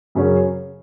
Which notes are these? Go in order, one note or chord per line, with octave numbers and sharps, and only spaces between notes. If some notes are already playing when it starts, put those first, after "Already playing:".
F#2 C#3 F#3 C#4